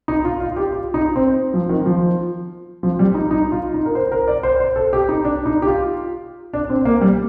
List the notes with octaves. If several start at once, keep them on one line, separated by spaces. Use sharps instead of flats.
D#4
F4
F4
G4
F4
D#4
C4
F3
D#3
F3
F3
G3
D#4
D#4
F4
D#4
A#4
C5
A#4
D5
C5
C5
A4
G4
D#4
D4
D#4
G4
F4
D4
C4
A#3
G3